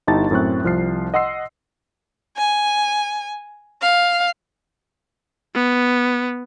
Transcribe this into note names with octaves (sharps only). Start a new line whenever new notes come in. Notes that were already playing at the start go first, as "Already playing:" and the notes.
G1 D#4 E4 G4 A5 A6
F#2 A2 C4 C#6 F#6
C2 F3 F6 C7
D#5 F#5 C6 E6 C7
G#5
F5
B3